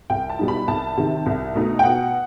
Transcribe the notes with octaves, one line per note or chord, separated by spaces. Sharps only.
C2 G5
A5
B2 G3 D#4
B5
C2 A5
C3 D#3
C2
B2 A3 D#4
G5
B2 F#5